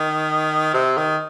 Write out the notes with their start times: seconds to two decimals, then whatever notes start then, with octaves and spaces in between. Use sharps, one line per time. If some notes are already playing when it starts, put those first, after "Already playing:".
Already playing: D#3
0.74 C3
0.97 D#3